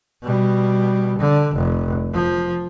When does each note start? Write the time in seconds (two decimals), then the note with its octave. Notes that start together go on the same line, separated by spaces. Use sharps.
0.23 B2 G3
1.19 D3
1.56 F1
2.13 F3